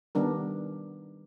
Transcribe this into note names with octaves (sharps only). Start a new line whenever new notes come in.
D#3 G3 B3 D4 A#4